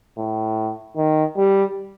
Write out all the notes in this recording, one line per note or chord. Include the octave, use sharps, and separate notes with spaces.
A2
D#3
G3